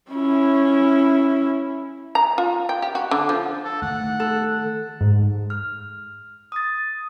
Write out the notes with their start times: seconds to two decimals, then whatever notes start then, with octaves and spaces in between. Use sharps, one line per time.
0.10 C#4 E4
2.15 A#5
2.38 F4
2.69 G5
2.82 G4
2.95 F#4
3.11 D3
3.29 F3
3.65 A4
3.82 D#3 A3 F#5
4.20 A4
5.01 G#2
5.50 F6
6.52 D#6 A6